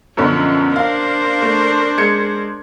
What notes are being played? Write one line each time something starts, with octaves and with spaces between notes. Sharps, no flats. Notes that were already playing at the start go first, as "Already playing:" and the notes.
F#2 B2 D3 F3 C#4
D4 A#4 C5 F5
A3
G#3 G#6 C#7